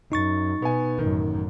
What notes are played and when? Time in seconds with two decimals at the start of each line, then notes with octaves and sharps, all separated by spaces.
0.12 F#2 D#4 C#6 A6
0.62 B2 B3 G#5
0.99 A1 F#2 D#3